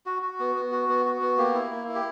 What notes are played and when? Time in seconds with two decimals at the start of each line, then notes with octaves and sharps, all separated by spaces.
0.06 F#4
0.22 F#4
0.39 B3
0.55 B3
0.72 F#4
0.89 B3
1.05 F#4
1.21 B3
1.38 A#3 G4
1.54 E4
1.71 A#3
1.88 E4
1.95 G4